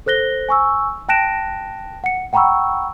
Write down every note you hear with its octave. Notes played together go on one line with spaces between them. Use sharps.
A4 C5 F#6 A#6 G7
G#5 C#6 E6
G5 A5 F#6 A#6 D7 E7
F#5 C#7
F#5 G5 A#5 B5 C#6 E6